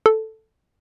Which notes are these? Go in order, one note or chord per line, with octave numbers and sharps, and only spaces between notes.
A4